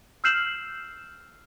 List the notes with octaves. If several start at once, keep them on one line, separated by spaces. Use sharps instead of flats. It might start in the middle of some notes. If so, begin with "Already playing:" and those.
E6 F6 G6 C7 E7 F#7